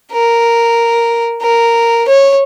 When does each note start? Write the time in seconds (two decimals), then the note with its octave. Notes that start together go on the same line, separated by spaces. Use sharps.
0.12 A#4
1.42 A#4
2.08 C#5